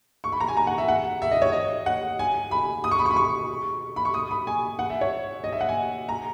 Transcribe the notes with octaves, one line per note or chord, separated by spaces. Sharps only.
C#6
B5
A#5
G#5
A#5
F#5
E5
F#5
E5
D#5
C#5
D#5
F#5
G#5
B5
D#6
C#6
B5
C#6
B5
C#6
B5
C#6
D#6
B5
G#5
F#5
E5
C#5
D#5
E5
F#5
G#5
A#5